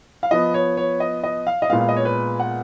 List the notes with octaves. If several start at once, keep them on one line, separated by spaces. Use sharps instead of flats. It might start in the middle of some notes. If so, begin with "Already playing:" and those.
F5
F3 B3 D#5
C#5
C#5
D#5
D#5
F5
D#5
A#2 G#3 B3 F5
F5
D#5
C#5
B4
F#5